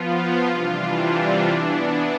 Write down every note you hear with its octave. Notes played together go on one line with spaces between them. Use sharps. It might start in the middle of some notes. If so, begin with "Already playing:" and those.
Already playing: F3 B3 F4
C3 E3 G3 D4 F4
E3 B3 D4